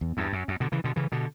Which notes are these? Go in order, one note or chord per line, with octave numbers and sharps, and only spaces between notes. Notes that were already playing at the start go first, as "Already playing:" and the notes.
E2
E2 G2
F#2
F#2
B2 D3
C#3 E3
B2 D3
C#3 E3
B2 D3